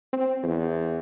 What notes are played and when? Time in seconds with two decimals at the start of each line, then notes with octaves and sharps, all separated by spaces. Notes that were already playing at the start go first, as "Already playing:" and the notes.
0.13 C4
0.43 E2